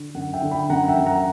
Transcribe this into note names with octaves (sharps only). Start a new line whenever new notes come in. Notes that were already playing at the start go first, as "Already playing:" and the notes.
Already playing: D3
F#2 F#5
E5 G5
D3
G5 B5
F#2 F#5 A#5
E5 G5
F#2
F#5 A#5